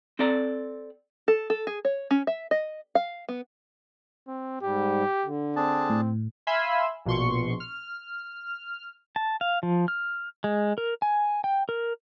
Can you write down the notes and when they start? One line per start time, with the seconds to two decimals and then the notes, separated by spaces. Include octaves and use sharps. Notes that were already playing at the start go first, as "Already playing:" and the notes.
0.19 C4 A4 D5 A#5
1.28 A4
1.50 A4
1.67 G#4
1.85 C#5
2.11 C#4
2.27 E5
2.51 D#5
2.95 F5
3.29 B3
4.27 C4
4.61 G#2 G3 G4
5.24 D3
5.56 C4 D4 G#4 A5
5.90 A2
6.47 E5 F5 G#5 B5 C6 E6
7.06 A#1 B2 C6 C#6
7.60 F6
9.16 A5
9.41 F5
9.63 F3
9.88 F6
10.44 G#3
10.78 A#4
11.02 G#5
11.44 G5
11.69 A#4